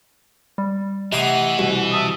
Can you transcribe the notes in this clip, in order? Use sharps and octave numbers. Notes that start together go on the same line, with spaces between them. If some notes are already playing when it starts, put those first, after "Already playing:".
G3
C3 E3 A3 D#5 F#5 G5 C6 D#6
C2 B2
E5 A5 D#6